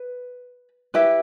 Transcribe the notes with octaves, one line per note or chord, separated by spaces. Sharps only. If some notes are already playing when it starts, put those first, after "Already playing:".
Already playing: B4
E4 G4 B4 E5